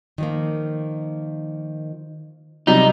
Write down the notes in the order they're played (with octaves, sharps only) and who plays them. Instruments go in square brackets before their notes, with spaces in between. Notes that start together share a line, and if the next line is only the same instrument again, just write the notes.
[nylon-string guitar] D#3 F3 A#3
[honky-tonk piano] C3 F#3 G3 [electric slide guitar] D#4